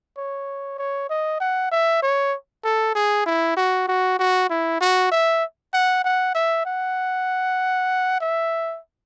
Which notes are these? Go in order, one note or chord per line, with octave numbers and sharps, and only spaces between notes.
C#5
C#5
D#5
F#5
E5
C#5
A4
G#4
E4
F#4
F#4
F#4
E4
F#4
E5
F#5
F#5
E5
F#5
E5